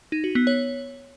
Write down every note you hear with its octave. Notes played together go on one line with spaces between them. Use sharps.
D#4
F#4
B3
C#5